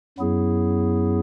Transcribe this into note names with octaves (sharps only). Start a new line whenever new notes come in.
F#2 F#3 B3 E4 G#4